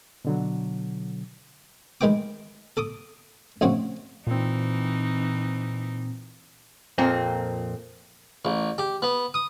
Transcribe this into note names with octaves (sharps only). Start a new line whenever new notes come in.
B2 D3 F#3
D#3 G#3 B4 G5 D6
A4 D6 D#6
A#1 A2 C#3 C4 F#4
A#2 E3 C4 D#4
F2 A#2 A#3 C4
A1
G4
B3
D#6